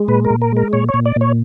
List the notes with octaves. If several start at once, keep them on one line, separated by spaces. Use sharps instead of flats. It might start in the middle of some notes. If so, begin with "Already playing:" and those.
Already playing: G#3
A#2 B4
A#4
A#2
A#4
G#3 A#4
A#2 C#5
C#5
A#2
D5
A#2 C#5